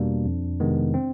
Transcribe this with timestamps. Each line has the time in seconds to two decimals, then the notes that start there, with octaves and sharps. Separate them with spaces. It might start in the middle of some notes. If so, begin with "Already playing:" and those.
Already playing: E2 B2 G3 A#3 D4
0.26 F2
0.60 C3 D#3 G#3 B3
0.94 C4